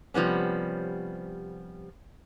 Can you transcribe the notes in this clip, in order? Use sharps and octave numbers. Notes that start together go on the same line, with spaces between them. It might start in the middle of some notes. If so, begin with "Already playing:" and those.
C3 F3 G3 B3 C#4